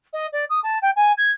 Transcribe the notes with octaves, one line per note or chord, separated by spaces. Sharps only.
D#5
D5
D#6
A5
G5
G#5
G#6